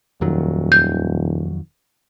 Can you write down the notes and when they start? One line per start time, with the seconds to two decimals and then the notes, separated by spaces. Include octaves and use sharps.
0.21 D#1 F2 D#3 F#3
0.72 G6